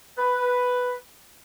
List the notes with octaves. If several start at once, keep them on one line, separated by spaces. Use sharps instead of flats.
B4